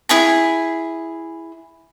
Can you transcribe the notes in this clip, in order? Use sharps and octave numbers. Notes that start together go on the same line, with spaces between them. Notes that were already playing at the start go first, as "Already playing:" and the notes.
E4 G#4 G#5